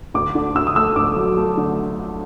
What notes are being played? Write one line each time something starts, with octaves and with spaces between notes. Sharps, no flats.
D2 D6
D3
D2 E6
D#6
A3 E6
D2 D6
F#3
A3
D3